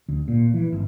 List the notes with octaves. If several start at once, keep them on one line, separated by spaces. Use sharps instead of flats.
D2
A#2
E3
G#1